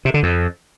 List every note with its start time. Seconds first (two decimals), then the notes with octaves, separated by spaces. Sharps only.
0.05 C3
0.14 D3
0.23 F2